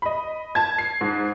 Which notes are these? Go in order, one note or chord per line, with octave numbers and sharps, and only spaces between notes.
D#5 B5
A5 G#6
C7
G#2